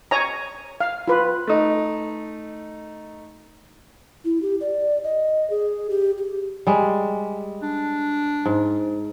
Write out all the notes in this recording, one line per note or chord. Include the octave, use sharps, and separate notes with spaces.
C#5 G#5 A#5
F5
F4 B4
A3 D#4
E4
G4
D5
D#5
G#4
G4
G4
G3 G#3
D4
G#2